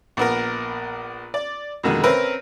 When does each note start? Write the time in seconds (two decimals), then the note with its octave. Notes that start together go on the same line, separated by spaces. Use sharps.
0.17 A#1 B3 A#4
1.34 D5
1.83 F2 B2 D3 D#3 G#3
2.03 C4 C#4 A#4 B4 E5